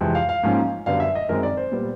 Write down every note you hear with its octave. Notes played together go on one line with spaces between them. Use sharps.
F2 C3 E3 G#3
F5
F5
G#2 F3 A#3 C#4
F#2 D3 G3 B3 F5
E5
D#5
F#2 D#3 G#3 C4 A#4
D5
C5
A#2 G3 B3